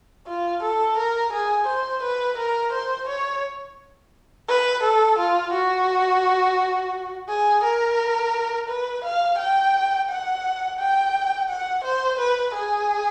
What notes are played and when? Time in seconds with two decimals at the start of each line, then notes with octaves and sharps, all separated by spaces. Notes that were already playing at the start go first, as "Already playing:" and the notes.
0.27 F4
0.63 A4
0.98 A#4
1.33 G#4
1.67 C5
2.03 B4
2.38 A#4
2.73 C5
3.09 C#5
4.49 B4
4.83 A4
5.19 F4
5.53 F#4
7.29 G#4
7.64 A#4
8.69 B4
9.04 F5
9.38 G5
10.10 F#5
10.79 G5
11.49 F#5
11.84 C5
12.19 B4
12.54 G#4